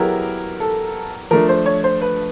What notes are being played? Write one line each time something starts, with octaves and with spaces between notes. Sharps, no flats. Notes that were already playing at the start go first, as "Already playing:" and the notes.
Already playing: F#3 B3 E4 G4 G#4 A#4
A4
F3 A3 D4 A#4
C5
C#5
C5
B4